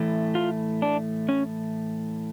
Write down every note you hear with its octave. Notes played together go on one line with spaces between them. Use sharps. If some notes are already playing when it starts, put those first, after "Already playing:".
Already playing: A2 E3 A3
F4
D4
C#4